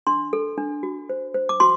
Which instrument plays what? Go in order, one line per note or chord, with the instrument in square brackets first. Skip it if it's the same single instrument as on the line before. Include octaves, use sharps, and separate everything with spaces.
[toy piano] D4 C6
A4
D4
F#4
C5
C5
D6
F#4 C6